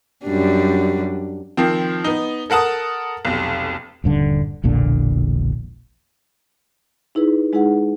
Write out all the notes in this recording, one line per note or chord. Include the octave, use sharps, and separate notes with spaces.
F#2 G3 D4
D#3 F3 C4
B3 D#4
A4 A#4 F#5 A5 D#6
F1 B1
D#1 G2 D3
E1 A#1 A#2 D3
D#4 E4 G#4 B4
G#3 D#4 E4 G#4 B4 F#5